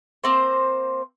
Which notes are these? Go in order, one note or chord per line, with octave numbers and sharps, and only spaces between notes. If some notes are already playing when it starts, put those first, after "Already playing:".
A#3 C4 C5